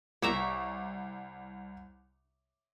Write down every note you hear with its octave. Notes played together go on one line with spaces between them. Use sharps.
C2 C#5 E5 A#5 D6